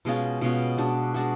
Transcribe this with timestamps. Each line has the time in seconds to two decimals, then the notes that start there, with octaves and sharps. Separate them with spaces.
0.05 B2 G#3 C#4 F4
0.41 B2 G#3 C#4 F4
0.78 G#3 D4 F#4
1.14 G#3 D4 F#4